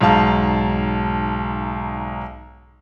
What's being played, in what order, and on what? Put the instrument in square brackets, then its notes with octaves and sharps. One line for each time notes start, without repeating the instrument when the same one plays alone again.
[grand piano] B1 G#2 F5 A5